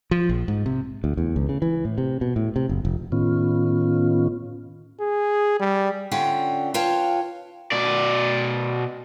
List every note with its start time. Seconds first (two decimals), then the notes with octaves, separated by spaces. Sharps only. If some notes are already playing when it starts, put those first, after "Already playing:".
0.11 F3
0.29 A#1
0.48 G#2
0.66 C3
1.04 D2
1.17 E2
1.36 C#2
1.49 C#3
1.62 E3
1.85 A2
1.98 C3
2.21 B2
2.36 A2
2.56 C3
2.69 F#1
2.85 F1
3.12 A2 D#3 B3 C#4 F4
5.00 G#4
5.59 G3
6.11 D3 C#4 F4 F#5 G5
6.74 F4 B4 C#5 F5 G5 A5
7.72 B2 D5